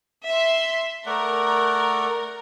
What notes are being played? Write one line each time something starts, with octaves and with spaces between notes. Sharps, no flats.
E5 C6
A3 A#4 D5 F#5